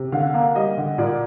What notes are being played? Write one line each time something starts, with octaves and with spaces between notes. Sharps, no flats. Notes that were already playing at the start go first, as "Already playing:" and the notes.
Already playing: C3
D3 F5
A#3
G3 D#5
D3
A#2 D5